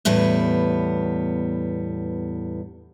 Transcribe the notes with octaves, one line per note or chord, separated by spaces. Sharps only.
E2 A2 G3 B3